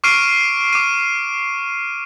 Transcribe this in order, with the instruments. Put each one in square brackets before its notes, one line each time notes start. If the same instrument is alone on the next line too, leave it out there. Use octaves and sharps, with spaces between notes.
[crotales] C#6 D6 F6 C7 D7 D#7
D6 D#7